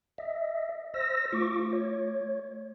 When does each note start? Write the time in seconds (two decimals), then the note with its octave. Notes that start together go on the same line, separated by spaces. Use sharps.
0.18 D#5 E5
0.94 C5 E6 A#6
1.32 A3 F4 C#6 D6
1.73 C#5